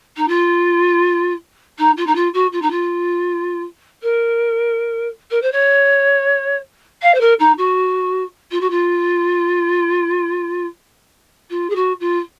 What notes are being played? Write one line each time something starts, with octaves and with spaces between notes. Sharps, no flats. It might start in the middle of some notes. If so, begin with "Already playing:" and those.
D#4
F4
D#4
F4
D#4
F4
F#4
F4
D#4
F4
A#4
A#4
C5
C#5
F5
C5
A#4
D#4
F#4
F4
F#4
F4
F4
G#4
F#4
F4